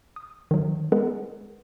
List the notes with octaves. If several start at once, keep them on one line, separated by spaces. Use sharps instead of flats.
D#6
D#3 F#3
G#3 B3 G#4 A#4 B4 F#5